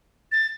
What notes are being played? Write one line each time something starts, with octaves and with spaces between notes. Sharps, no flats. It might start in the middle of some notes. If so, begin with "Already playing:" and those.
A6